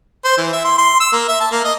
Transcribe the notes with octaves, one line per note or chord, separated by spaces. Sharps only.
C5
E3
E5
C6
C6
E6
A#3
E5
A5
A#3
D#5